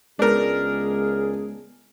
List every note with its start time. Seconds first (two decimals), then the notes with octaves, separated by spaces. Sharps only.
0.19 C#2 G#3 B3 D4 G#4 A#4 A5